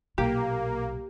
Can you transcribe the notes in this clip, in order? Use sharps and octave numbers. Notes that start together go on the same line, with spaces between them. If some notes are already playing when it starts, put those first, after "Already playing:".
B1 A#2 A#3 G4